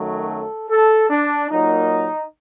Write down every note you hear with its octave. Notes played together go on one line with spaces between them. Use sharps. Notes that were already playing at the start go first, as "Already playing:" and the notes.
Already playing: F#2 D#3 F#3 A3
A4
A4
D4
A#2 F#3 A#3 D#4